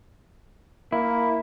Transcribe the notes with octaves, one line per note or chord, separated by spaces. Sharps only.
A#3 E4